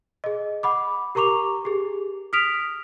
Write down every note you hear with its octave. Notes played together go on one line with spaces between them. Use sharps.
G#4 D#5
F#5 B5 D6
G4 A#4 A#5 C#6 D6 F7
G4 G#4
D#6 F6 B6 D7 F7